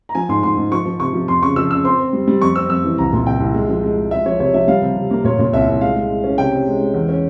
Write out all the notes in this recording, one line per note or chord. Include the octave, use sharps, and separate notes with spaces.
A#5
F3 G#5
G#2 C6
G#2 C6
G#2
F3 C#6
F3
C3 C#6
F3
F2 C6
C#3 C#6
F3 E6
C#3 E6
C4 C6
C4
G3
G3
F2 C#6
C4 E6
F2 E6
E3
C2 A#5
A#2
C2 G5
C2
G#3
F3
G#3
G#3
G#3 E5
F3 C#5
C3 C#5
F3 E5
G3 F5
C3
C3
A#3
A#2 C#5
A#2
C2 E5
C2
G#3 F5
G#3
G#3
C#4
C3 G5
C3
G#3
G#3
E2
C#4